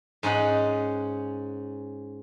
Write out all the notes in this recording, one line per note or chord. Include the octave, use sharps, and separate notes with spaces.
G#2 C#4 D#4 F#5